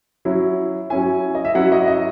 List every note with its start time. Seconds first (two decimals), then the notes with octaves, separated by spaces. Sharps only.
0.25 F#3 C#4 E4
0.90 F#3 C#4 E4 G#5
1.35 D#5
1.45 E5
1.55 F#3 C#4 E4 F#5
1.72 D#5
1.88 D#5